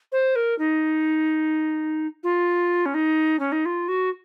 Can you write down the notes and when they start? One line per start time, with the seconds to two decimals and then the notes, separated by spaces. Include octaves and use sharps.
0.12 C5
0.35 A#4
0.59 D#4
2.23 F4
2.86 C#4
2.94 D#4
3.39 C#4
3.52 D#4
3.65 F4
3.88 F#4